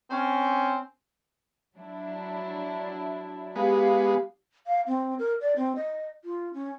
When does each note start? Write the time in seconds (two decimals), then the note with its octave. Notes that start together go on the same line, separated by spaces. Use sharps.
0.10 C4 C#4
1.77 F#3 D4 E4
3.56 G#3 B3 G4 F5
4.67 F5
4.87 C4
5.19 A#4
5.41 D5
5.56 C4
5.76 D#5
6.24 F4
6.54 C#4